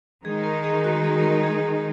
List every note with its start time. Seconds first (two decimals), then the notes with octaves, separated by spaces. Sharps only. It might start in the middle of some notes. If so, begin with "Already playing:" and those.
0.24 D#3 G#3 D#4 G#4
0.44 A#4
0.64 G#4
0.84 F#4
1.04 G#4
1.23 A#4
1.43 G#4